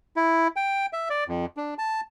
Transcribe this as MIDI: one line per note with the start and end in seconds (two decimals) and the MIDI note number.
0.16 0.48 64
0.56 0.86 79
0.93 1.09 76
1.10 1.24 74
1.28 1.46 41
1.57 1.74 62
1.78 2.01 81